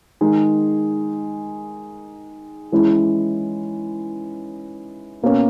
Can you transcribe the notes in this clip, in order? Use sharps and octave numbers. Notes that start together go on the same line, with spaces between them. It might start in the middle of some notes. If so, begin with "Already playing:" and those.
D#3 G#3 D#4 G#4
E3 G#3 C#4 E4
B2 A#3 C#4